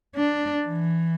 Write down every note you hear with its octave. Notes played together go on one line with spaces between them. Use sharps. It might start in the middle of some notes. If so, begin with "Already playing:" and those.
D4
E3